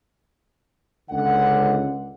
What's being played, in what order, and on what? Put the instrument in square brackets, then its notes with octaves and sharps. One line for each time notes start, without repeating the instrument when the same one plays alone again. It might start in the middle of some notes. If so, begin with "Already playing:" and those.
[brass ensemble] C#2 D3 F#5